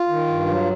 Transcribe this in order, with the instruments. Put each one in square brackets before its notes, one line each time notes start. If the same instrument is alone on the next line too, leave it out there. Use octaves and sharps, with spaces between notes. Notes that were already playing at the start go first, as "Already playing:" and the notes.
Already playing: [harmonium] F4
D#3
G2
F#3